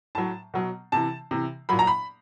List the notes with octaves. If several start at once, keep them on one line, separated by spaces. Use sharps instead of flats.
A2 F#3 A5
B2 F#3
C3 E3 A5
C3 E3
A#2 F#3 B5
A#5
B5